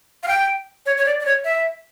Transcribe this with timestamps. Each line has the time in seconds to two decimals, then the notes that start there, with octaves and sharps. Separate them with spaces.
0.23 F5
0.28 G5
0.86 C#5
0.98 C#5
1.06 D5
1.20 D5
1.25 C#5
1.44 E5